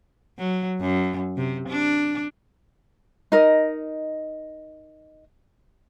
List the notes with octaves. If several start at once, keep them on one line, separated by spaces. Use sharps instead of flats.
F#3
F#2
C3
D4
D#4 A#4 D#5